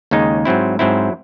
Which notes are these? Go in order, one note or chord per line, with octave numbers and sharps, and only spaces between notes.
D#2 C#3 G#3 D#4
G#2 F#3 C4 E4
G#2 F#3 C4 E4